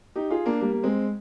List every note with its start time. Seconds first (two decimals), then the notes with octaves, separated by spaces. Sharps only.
0.15 D#4 G4
0.31 F4 G#4
0.46 A#3 D4
0.61 G3 A#3
0.72 A#3
0.83 G#3 C4